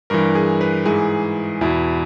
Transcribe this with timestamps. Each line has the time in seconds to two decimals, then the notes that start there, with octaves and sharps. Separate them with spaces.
0.10 G2 E3 A#4
0.35 G#4
0.61 B4
0.86 G#2 E3 G#4
1.61 E2 B2 E4